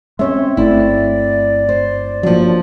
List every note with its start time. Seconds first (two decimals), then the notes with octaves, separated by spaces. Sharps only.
0.19 G#3 C4 C#4 C#5 E5 C6
0.57 G1 A3 C4 E4 D5
1.69 C5
2.23 F3 F#3 A#3 D4